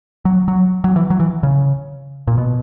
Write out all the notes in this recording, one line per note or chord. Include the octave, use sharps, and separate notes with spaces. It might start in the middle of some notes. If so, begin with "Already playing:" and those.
F#3
F#3
F#3
E3
F#3
E3
C#3
A#2
B2